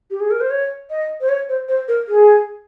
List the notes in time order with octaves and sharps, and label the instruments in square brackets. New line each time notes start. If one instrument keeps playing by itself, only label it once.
[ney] G4
G#4
A#4
C5
C#5
D#5
C5
C#5
C5
C5
A#4
G#4